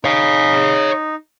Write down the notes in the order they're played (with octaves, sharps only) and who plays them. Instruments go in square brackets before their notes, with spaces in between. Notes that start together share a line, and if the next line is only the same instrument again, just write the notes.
[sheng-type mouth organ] D#4 [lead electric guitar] C#5 F5